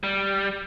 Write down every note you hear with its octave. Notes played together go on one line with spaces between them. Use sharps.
G3